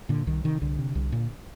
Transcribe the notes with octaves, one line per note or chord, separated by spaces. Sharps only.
A#2 D3
C2 D#3
C3 D#3
C2 D3
C3
C2
A#2